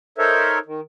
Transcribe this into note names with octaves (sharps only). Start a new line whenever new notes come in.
D#4 A4 A#4 C5 C#5 E5
D#3